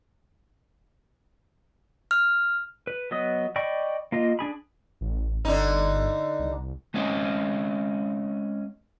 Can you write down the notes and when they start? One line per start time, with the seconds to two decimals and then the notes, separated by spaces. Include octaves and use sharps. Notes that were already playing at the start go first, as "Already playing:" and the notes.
2.11 F6
2.87 B4
3.11 F#3 B3 D#5 D#6
3.56 D5 D#5 G5 B5 C#6
4.12 A#3 F4 D#5
4.39 D4 G#4 B5
5.01 A1
5.45 G1 D3 D#4
6.40 C2
6.94 G#3 C4 C#4 D#5